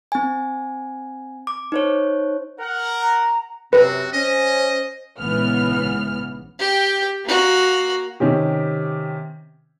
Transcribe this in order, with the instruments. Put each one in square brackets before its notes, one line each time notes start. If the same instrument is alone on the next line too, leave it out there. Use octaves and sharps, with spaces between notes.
[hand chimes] C4 G#5
D6
D#4 C5 C#5
[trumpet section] A#4 F#5
[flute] A#5
[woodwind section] F#2 C3 C4 [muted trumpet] F#4 [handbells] B4
[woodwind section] C#4 [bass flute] C5 [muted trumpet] D#5
[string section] A#1 G#2 C#3 E3 B3 F6
[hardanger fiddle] G4 G5
A#3 F#4
[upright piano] C3 D#3 C#4 G4